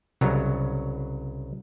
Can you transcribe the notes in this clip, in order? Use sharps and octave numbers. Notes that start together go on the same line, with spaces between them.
C2 C#3 F#3 C#5 A#5